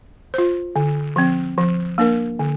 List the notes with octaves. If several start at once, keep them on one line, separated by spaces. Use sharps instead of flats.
F4 C5
D3
F3 C4
F3
A#3 D4 A#4
D3